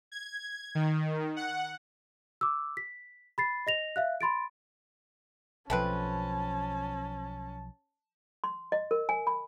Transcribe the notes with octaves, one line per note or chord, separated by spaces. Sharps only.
G#6
D#3
F#5
D6 E6
B6
B5 A6 C7
D#5 A#6 F7
E5 F5 F#6
B5 C6 A6 D7
B1 F3 A3 C4 C#4 B4 A5
C6
D#5
A#4
G#5
B5